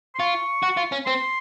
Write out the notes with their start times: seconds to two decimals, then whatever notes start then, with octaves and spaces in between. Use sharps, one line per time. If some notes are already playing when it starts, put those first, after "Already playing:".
0.15 C6
0.20 F4 C#6
0.63 F#4
0.77 F4
0.92 C#4
1.06 C4 C6